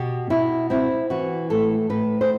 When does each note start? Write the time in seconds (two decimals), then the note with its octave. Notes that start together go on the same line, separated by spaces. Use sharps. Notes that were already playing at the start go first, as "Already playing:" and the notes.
Already playing: B2 G4
0.30 B2 E4
0.70 C4 E4
1.10 E3 F#4
1.50 A2 A4
1.90 A2 B4
2.21 C5